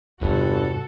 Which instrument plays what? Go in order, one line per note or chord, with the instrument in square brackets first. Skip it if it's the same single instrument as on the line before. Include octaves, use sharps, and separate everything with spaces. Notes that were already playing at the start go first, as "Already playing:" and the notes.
[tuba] G1 [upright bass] E2 C3 [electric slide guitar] G2 [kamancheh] F#4 A4